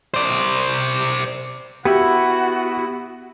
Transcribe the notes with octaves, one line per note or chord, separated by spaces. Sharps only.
C5 D5
B3 E4 F#4 G4 E5